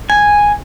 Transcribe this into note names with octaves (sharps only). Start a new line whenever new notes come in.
G#5